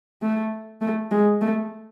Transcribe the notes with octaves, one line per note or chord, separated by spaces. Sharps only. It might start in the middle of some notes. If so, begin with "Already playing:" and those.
A3
A3
G#3
A3